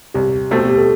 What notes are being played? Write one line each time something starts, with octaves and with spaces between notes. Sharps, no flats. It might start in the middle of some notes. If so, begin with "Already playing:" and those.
C2 G4
B2 A3 C4
G4
A4